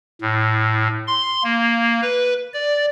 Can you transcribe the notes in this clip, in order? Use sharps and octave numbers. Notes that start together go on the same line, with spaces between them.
A2
C6
A#3
B4
D5